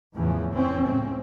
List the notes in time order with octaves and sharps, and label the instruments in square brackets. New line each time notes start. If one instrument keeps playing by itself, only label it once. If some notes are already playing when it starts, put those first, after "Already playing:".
[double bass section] E2 A2 C#3 E3 F3
F1 E3 C4 C#4
C#2 A2 C#3 G#3 C4